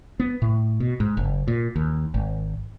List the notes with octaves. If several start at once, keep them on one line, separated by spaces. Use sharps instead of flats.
B3
A2
B2
G#2
F#1
A#2
D#2
G#1